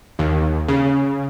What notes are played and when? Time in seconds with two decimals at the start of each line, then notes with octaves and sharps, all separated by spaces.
0.19 D#2
0.69 C#3